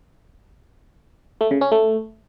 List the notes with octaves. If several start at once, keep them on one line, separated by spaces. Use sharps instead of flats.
A3
C#3
C#4
A3